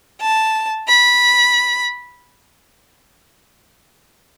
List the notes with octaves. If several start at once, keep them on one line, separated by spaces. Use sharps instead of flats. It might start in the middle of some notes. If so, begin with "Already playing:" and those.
A5
B5